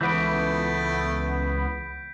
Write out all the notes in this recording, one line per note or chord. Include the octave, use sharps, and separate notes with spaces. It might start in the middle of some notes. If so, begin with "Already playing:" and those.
C#2 E3 A3 B3 G6 B6 D7